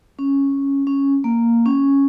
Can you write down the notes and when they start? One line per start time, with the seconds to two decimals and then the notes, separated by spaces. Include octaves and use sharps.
0.19 C#4
0.87 C#4
1.24 A#3
1.66 C#4